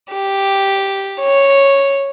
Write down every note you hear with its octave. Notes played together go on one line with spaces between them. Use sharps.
G4
C#5